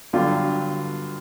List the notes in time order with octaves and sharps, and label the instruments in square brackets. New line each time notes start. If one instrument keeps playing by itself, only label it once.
[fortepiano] G2 D3 F#3 F4